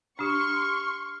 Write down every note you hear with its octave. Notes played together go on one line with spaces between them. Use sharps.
D4 G4 C6 C#6 F6